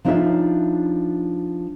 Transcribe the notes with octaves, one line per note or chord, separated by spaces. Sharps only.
F3 D4 D#4 F4 C#5 E5